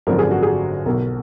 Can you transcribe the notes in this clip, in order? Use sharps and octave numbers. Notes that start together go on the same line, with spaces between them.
G#1 F#2 D3 F3 A#4
G#4
F#4
G#4
B1 B2 A#4